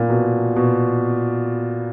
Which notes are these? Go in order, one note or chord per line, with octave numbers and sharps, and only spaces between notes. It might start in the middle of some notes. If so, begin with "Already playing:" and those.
Already playing: A#2
B2
B2